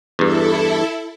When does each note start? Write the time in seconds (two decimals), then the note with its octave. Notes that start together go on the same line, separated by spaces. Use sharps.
0.19 E2 G2 E4 A4